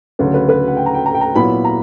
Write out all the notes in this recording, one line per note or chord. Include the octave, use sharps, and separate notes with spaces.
D2 C#3 F#3 B4
B4
B4
F#5
G5
A#5
G5
A#5
G5
A#5
A#2 F#3 B3 E4 B5
A#5